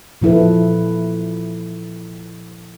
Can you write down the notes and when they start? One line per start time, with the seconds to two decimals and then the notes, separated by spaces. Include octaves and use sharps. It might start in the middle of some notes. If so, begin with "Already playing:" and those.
0.22 A#2 F3 E4 A4 B4